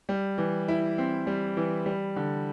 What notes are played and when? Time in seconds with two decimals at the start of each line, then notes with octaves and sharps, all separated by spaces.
0.09 G3
0.38 E3
0.68 E4
0.98 C4
1.27 G3
1.57 E3
1.86 G3
2.16 D3